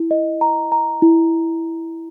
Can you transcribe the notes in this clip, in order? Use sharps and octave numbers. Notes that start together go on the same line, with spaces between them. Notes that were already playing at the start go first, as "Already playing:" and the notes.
Already playing: E4
D#5
A#5
A#5
E4